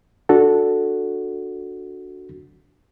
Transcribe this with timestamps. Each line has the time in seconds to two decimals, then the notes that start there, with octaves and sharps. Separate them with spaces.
0.29 D4 F#4 A4